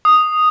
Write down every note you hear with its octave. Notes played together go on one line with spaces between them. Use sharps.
D#6